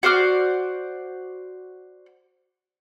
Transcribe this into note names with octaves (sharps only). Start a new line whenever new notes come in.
F#4 C5 D5 F6